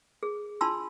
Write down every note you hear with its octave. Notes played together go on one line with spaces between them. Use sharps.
G#4
D4 F4 A5 B5 C6 E6